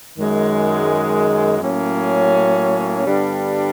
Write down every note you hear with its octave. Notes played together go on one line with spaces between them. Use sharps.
F#2 D#3 G#3
A2 F#3 A#3 C#4
G2 D3 G3 B3 D4